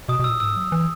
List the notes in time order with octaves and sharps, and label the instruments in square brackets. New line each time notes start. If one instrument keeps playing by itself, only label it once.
[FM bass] B2 [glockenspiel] D#6
[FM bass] B2
[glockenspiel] E6
[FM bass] A#2
[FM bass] G#2 [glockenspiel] E6
[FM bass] F#3
E3